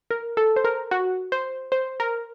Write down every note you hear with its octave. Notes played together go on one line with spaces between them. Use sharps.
A#4
A4
C5
A#4
F#4
C5
C5
A#4